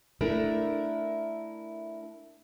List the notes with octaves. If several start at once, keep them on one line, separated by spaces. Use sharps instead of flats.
A3 D4 E4 A4 A#4